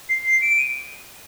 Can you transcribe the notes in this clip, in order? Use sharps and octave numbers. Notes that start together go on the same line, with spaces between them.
C7
D7
D#7